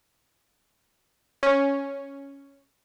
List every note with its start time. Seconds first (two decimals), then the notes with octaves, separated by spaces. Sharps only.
1.43 C#4